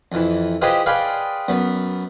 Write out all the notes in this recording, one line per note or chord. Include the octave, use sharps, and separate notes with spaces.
F2 E3
F4 G4 G#4 B4 C5 D#5
G#4 B4 D5 F5 G5 C6
F#2 B3